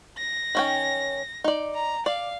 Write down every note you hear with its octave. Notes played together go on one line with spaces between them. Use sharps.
A#6
D#3 C#4 G5
D#4 D5
A#5
D5 F5